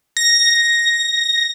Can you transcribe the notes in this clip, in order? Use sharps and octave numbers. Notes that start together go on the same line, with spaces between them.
A#6